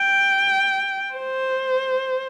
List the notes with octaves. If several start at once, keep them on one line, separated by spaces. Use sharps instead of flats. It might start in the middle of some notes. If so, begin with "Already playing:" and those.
Already playing: G5
C5